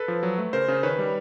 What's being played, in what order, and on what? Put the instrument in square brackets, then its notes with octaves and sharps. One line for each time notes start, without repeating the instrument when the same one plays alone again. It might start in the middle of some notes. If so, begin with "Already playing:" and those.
Already playing: [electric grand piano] A4 B4
F3
F#3
A3
C#3 A#4 C5
C#3
D#3 B4 C#5
G3